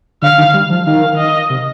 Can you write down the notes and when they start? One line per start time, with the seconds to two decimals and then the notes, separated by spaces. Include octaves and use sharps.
0.22 D3 F5
0.38 D#3
0.54 G3
0.70 F3
0.87 D#3 F5
1.18 D#5
1.50 C3